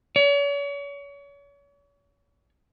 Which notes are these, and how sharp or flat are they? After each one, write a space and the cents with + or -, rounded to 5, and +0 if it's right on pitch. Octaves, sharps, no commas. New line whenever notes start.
C#5 +40